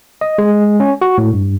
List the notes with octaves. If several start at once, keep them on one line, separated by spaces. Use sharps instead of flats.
D#5
G#3
C#4
F#4
A2
G2